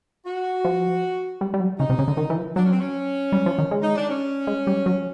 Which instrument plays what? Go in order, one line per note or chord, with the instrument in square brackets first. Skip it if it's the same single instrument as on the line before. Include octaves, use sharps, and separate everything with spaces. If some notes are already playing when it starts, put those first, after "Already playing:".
[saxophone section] F#4
[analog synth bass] F3
G3
G3
F#3
[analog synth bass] C#3 [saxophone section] D#4
[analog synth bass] C3
C#3
D3
D#3
E3
F3
[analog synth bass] F#3 [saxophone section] D4
[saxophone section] C#4
C4
C#4
[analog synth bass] G3
F3
D#3
G#3
[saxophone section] D#4
D4
C#4
[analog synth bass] G#3
G3
F#3